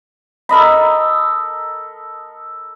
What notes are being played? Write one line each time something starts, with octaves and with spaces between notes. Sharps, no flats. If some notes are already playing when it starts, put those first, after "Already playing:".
A4 A#4 D#5 B5